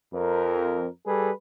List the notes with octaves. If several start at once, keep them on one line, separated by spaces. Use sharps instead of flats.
F2 A#4
G3 G#4 A4 B4